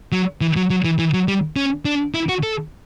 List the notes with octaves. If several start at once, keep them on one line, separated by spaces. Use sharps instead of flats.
F#3
E3
F#3
F#3
E3
E3
F#3
G3
C#4
D4
E4
F#4
A4